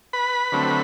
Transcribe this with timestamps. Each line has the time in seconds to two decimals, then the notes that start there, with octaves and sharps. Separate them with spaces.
0.13 B4 B5
0.52 D3 F#3 A3 C4